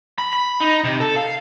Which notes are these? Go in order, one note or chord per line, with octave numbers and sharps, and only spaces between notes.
B5
B5
D#4
C3
A4
F5